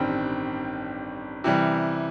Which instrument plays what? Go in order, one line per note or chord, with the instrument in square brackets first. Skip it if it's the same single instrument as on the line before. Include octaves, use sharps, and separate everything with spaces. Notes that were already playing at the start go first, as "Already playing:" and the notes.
Already playing: [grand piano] A1 G2 D#3 G3 C4
C3 E3 G3